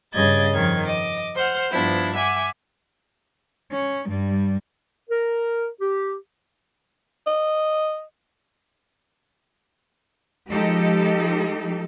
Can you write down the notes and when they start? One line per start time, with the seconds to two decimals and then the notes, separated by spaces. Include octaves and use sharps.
0.13 G2 C#3 D#5 G#6 A6
0.54 F2 D#3 G#6
0.85 D#5 D6
1.36 C5 F#5 F6
1.71 G2 F3 B3 D4 E4
2.14 E5 F#5 G#5 D6
3.72 C#4
4.07 G2 G3
5.10 A#4
5.81 G4
7.27 D#5
10.50 F3 G#3 D#4 G4 A4